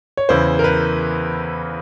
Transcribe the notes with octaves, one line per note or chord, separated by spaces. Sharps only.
C#5
E2 C#3 E3 C5
A#4
B4